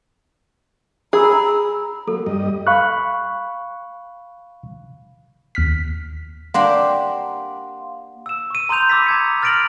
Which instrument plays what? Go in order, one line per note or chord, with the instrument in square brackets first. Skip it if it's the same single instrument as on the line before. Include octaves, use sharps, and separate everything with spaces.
[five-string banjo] G#4 [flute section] A#5 B5 E6
[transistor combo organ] F#3 A#3 [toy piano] A4
[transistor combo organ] G2 G3 D#5
[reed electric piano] F5 B5 C#6 F#6
[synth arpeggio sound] D#2 F6 B6
[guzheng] A#3 D4 G4 [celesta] F5 F#5 C6
[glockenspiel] E6 E7
C#6 D#7
A#5 C6 D#6 G6 F7
B5 D6 E6 A6 B6
A#5 G#6 C#7
F6 A6 A#6 D7 F7 F#7